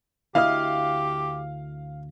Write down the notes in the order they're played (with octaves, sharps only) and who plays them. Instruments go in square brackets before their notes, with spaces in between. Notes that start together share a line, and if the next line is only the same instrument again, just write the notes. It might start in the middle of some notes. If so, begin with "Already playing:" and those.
[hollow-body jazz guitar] D2 E4 D#5 [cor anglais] G4 [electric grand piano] F5 F6